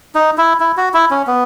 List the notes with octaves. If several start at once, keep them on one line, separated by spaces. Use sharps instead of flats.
D#4
E4
E4
F#4
E4
C#4
B3